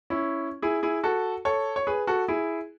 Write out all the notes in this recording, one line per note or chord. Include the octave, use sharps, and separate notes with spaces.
C#4 E4
E4 G#4
E4 G#4
F#4 A4
A4 C#5
C#5
G#4 B4
F#4 A4
E4 G#4